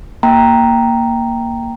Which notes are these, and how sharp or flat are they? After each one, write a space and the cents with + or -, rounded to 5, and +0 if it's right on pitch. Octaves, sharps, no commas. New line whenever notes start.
A#3 +0 G5 +0 A#5 +0